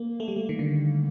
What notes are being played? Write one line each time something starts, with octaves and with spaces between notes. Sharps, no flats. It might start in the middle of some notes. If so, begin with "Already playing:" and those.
Already playing: A#3
A3
G3
A3
D#3
D3